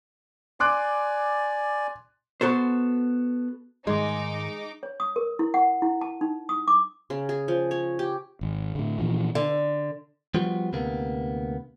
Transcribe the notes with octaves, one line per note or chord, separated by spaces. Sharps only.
D5 G#5 C6 D6 F#6
B3 F#4 A4 C5
G#2 D#3 G#3 D#4 D6
C#5
D#6
A#4
E4
F#5
E4
A5
D#4
D#6
D6
C#3
G#4
F3
C#5
G4
G#1
A2 D3
A#2 E3 F3
D3
F3 G3 B3 F4 F#4
D2 C3 A#3 B3